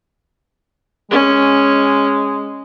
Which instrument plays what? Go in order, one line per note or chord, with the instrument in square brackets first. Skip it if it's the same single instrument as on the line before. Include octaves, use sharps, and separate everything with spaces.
[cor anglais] G#3 [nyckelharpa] C#4